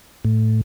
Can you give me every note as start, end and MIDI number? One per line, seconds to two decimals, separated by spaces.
0.25 0.61 45